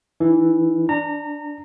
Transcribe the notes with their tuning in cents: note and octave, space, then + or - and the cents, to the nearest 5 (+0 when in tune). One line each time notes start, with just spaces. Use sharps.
E3 +0 D#4 -30
D4 +0 A#5 -25